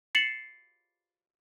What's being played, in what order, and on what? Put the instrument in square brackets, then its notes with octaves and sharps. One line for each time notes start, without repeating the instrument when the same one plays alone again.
[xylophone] A6 C7 C#7 E7 F#7